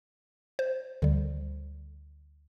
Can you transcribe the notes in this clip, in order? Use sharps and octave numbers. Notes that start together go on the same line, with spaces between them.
C5
D2 D3 G3